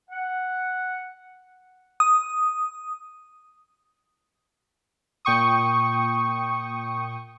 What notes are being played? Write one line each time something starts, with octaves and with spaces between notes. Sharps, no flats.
F#5
D#6
A#2 G5 C#6 D#6